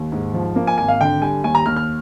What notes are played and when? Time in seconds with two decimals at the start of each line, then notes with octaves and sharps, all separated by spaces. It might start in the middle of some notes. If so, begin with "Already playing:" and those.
Already playing: D#2
0.12 G#2
0.34 F3
0.56 A#3
0.67 G#5
0.78 G#1 G#5
0.88 F5
1.00 D3 G5
1.22 G3 G#5
1.44 D#2 G#5
1.55 A#5
1.66 D#2 F6
1.76 F6